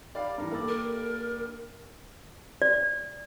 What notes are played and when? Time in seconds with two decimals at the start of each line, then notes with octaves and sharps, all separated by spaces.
0.15 G3 D5 F5
0.38 G2 E3 A#4
0.52 A#3 D4 A4 D5
0.68 A#4
2.62 D5